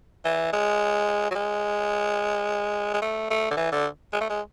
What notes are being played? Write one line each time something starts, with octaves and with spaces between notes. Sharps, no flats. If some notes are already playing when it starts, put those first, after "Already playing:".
E3
G#3
F#3
G#3
G#3
A3
A3
D3
E3
D3
G#3
A3
G#3